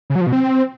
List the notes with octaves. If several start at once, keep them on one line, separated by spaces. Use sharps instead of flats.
C#3
F#3
F3
B2
C4